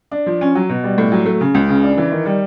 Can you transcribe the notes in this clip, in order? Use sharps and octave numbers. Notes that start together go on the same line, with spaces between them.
D4
F3
C#4
F#3
B2
G3
A2
F#3
A3
C#3
C#2
C#3
D4
E3
D#3
G3